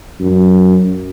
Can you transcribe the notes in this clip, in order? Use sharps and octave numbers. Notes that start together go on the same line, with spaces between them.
F#2